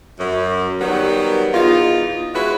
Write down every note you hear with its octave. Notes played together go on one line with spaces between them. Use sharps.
F#2
D#3 F#3 G3 B3
E2 D#4 F4
G#3 C#4 E4 F#4 B4